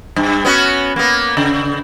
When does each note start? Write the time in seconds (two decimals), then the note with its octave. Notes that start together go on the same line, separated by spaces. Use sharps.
0.16 G2
0.45 B3 C#4 F#4
0.96 A#3 B3
1.37 C#3